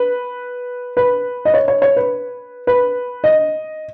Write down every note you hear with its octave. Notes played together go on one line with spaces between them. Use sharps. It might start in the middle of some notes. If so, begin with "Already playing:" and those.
Already playing: B4
B4
D#5
C#5
C#5
C#5
B4
B4
D#5